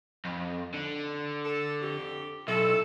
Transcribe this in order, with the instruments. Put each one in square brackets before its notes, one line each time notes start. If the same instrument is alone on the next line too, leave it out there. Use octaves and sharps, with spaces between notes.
[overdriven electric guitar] F2
D3
[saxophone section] A4
F2 G4
[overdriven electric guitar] B1 [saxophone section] E4 A4